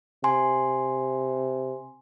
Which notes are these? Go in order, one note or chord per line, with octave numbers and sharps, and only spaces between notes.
C3 G#5 C6